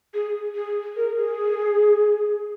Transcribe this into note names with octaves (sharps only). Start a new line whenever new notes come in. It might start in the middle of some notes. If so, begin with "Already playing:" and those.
G#4
G#4
A#4
G#4